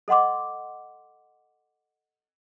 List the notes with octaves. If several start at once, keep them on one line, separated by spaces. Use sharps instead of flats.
A4 D#5 F#5 C6 D6